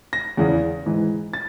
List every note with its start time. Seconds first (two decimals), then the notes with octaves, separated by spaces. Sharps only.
0.13 A#6
0.37 E2 C#3 E3
0.86 G#2 E3
1.33 A6